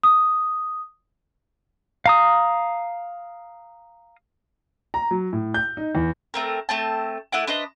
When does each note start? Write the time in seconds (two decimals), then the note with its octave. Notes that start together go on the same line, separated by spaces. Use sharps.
0.03 D#6
2.06 F5 A#5 D#6
4.94 A#5
5.11 F#3
5.33 A2
5.54 G6
5.77 D#4
5.95 E2
6.34 A3 C4 A#4
6.69 A3 C4 A5
7.32 A3 E4 F#5 D6
7.47 D4 B4 C5 D#5